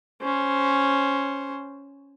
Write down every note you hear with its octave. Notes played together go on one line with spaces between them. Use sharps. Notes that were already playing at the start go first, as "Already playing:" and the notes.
C#4 C5